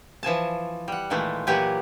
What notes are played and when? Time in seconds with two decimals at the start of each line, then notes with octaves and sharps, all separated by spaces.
0.23 E3 F3 G#5 A5
0.88 G3 F#5
1.10 A#2 D#3 E3 G#3 A3
1.47 A#2 E3 F#3 G4 F#5 G#5